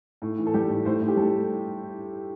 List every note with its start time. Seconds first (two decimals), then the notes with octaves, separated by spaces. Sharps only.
0.22 A2
0.38 E3
0.47 A4
0.54 G3 G4
0.69 A2
0.85 A2 C5
1.01 A2
1.08 G4
1.17 G3 A4